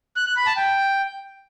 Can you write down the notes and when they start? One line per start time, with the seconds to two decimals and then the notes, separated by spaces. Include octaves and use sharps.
0.16 F#6
0.26 F#6
0.36 B5
0.47 A5
0.57 G5